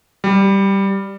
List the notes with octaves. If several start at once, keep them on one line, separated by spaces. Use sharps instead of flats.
G3